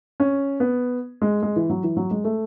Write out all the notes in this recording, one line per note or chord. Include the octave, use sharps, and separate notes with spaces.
C#4
B3
G#3
G#3
E3
F#3
E3
F#3
G#3
A3